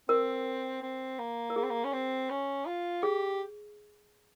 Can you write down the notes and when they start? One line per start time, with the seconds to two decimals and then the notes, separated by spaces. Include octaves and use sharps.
0.08 C4 A#4
0.83 C4
1.19 A#3
1.50 A#4
1.56 A#3 G#4
1.63 C4
1.70 A#3
1.84 C#4
1.93 C4
2.30 C#4
2.66 F4
3.03 G4 G#4